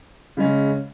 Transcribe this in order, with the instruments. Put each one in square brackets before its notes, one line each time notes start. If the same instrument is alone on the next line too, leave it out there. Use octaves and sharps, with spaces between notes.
[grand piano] C#3 G#3 C#4